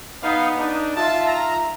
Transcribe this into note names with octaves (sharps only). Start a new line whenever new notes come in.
B3 D#4 F5
D4 D#4
F4 E5 A5
A#5